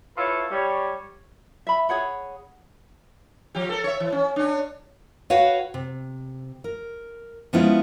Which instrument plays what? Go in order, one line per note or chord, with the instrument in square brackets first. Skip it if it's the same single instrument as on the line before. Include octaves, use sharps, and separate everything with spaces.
[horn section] E4 F4 A4 B4 C#5
G3 C#5
[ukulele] E5 B5
G#4 C#5 F#5 B5
[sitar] F3 G4
A4 A#4
C#5 E5
E3
C#4
C#4 D4
[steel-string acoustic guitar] F#4 B4 C#5 F5 F#5 G#5
C3
A#4
F3 G#3 B3 C#4 E4 F4